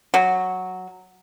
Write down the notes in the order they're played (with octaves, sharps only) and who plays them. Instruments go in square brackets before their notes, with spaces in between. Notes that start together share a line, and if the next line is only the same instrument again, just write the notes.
[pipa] F#3